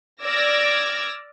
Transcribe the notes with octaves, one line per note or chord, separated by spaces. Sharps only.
D5 D6 E6 F6 G#6 A#6